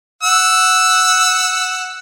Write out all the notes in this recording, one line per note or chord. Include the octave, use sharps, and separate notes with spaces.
F#5 E6